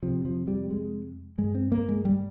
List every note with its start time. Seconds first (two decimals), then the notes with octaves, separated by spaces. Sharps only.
0.03 F2 C3 F3
0.25 F3
0.47 G3
0.70 G#3
1.38 G2 G#3
1.55 C4
1.72 A#3
1.89 G#3
2.05 G3